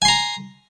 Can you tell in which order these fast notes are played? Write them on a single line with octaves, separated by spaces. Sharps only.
G#5 C6 A#5